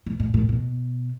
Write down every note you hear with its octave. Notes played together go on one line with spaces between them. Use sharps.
B2
A#2
A#2
B2